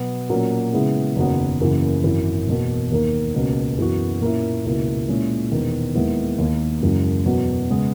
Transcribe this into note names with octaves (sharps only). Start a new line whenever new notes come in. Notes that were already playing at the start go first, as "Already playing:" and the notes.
Already playing: B2 F#3 B3
A#2 F#3 A#3 C#4
C#3 G#3 B3 E4 G#4
F#1 E2 D#3 F#3 B3
F#2 C#3 E3 A#3 C#4
G#1 F#2 E3
E1 E2 B2 A#3
D#2 D#3 A#3
C#2 B2 A#3 C#4
F#2 E3 B3 F#4
A#2 A#3 C#4 E4
C#2 B2 A#3 E4
A#2 G#3 C#4 E4
E1 E2 D#3
D#2 D#3 G#3 B3 E4
D#2 D#3 A#3
F#1 F#2 E3 G#3
E2 B2 F#3
C#3 G#3 B3